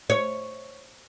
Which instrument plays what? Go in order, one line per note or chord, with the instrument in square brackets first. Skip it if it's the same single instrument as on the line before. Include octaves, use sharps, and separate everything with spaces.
[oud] C#5